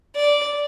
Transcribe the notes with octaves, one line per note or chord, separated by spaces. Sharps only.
D5